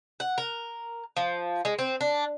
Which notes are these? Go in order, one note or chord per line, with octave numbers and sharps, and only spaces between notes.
F#5
A#4
F3
G#3
C4
D4